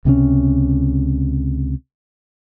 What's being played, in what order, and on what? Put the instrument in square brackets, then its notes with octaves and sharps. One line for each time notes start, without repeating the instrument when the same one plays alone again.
[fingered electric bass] C#2 C3 G#3 C#4